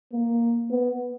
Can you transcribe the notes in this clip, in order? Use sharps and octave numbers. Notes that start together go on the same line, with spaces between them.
A#3
B3